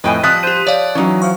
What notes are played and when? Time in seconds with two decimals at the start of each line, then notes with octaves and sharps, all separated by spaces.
0.04 F2 A2 B4 D#5 G5 G#5
0.24 F3 G3 C4 D#6 F#6 B6
0.43 G4 C5 D#7
0.67 F3 C#5 D5 F5
0.95 E3 F#3 C#4 D#4
1.22 F3 C#6